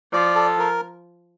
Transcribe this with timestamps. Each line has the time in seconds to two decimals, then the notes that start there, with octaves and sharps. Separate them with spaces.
0.13 F3 D5
0.36 A4
0.59 A#4